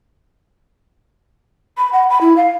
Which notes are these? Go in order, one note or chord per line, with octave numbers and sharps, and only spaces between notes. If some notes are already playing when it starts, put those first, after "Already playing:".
B5
F#5
B5
E4
F5